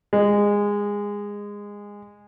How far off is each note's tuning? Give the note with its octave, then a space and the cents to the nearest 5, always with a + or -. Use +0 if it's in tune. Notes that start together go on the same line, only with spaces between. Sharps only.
G#3 -20